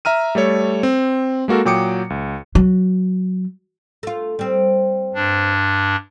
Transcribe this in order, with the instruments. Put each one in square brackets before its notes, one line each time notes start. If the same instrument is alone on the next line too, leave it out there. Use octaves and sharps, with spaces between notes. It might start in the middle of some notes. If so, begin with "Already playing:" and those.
[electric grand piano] E5 A#5 F6 D#7
G3 A3 A4 C#5
C4
G#3 A#3 F#4 A4 A#4
A#2 F#3 G5 D6 D#6 C#7
C#2
[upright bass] F#3
[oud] A3 F4
G3 C4
[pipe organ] G2 D4